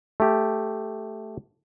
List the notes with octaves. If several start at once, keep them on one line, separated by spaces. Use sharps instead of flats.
A3 G4